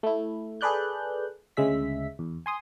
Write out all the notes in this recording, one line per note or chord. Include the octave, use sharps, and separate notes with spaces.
A3 E4
G#4 A4 B4 D5 F#6 G6
D2 C#3 G#3 E5 B6
E2
G#5 C6 D#6